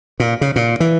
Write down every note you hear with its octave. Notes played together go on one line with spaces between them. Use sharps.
A#2
C#3
A#2
E3